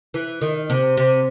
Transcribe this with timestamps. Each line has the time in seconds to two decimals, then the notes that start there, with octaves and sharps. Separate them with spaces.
0.14 E3
0.42 D#3
0.70 C3
0.97 C3